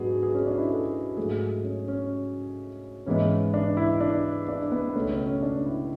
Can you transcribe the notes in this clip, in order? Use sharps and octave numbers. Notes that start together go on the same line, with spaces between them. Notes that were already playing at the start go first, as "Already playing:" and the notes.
Already playing: G#2 F#3 B3 D4 F#4 G#4
G#4
C#4
D4
E4
A4
G#2 F#3 A3 G#4
C#4
C#4
G#2 E3 G#3 B3 C#4
D4
E4
D4
D4
B3
C#2 B2 A3 C#4
C#4
C#4
D4
E4